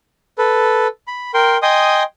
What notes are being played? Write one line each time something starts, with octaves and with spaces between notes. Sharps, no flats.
A4 B4
B5
A#4 G5 C6
D#5 G5 G#5 C6 D#6